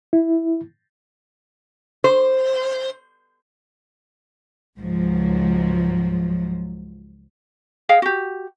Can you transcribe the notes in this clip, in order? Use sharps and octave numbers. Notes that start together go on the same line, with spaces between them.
E4
C5
C#2 G#2 F3 F#3
G#4 D#5 F5 G5
F#4 G4